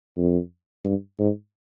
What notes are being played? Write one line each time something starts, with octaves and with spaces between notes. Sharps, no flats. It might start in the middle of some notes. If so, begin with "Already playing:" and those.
F2
G2
G#2